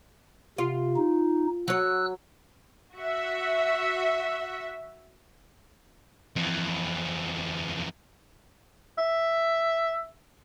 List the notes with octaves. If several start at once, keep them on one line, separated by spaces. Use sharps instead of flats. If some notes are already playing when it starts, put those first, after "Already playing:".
C3 F4
D#4
F#3 C#5 E6 F#6
F#4 E5
F2 E3
E5